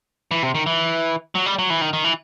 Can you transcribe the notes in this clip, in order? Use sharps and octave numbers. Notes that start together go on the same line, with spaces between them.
E3
C3
D#3
E3
F#3
G3
F#3
E3
D#3
D#3
E3